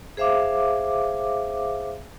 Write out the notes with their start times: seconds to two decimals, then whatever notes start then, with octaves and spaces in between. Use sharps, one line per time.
0.17 G#4 C5 E5 F5 D6